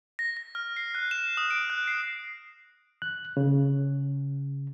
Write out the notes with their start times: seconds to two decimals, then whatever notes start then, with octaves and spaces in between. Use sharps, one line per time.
0.19 A#6
0.37 A#6
0.55 F6
0.77 C7
0.95 F#6
1.11 E7
1.37 D#6
1.51 D7
1.70 F#6
1.87 C7
3.02 F#6
3.37 C#3